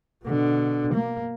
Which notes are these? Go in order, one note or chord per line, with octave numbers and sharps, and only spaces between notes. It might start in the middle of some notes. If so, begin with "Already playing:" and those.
B2 D3
A#3